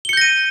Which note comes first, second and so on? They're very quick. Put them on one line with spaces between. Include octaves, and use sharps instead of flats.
G7 C#7 G6 A#6 D#7